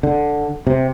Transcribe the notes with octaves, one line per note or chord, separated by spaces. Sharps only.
D3
C3